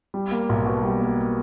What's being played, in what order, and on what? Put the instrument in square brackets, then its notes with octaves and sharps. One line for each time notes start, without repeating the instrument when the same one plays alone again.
[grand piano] G3
A#3
B1
B2
G3
A#3